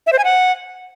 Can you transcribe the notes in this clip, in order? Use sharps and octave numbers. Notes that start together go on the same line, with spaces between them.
E5
C5
G#5
F#5